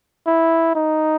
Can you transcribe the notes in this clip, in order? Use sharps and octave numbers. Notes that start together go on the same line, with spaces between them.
E4
D#4